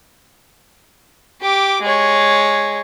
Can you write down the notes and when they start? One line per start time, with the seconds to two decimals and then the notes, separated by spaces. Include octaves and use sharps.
1.42 G4 D6
1.82 G#3 C#5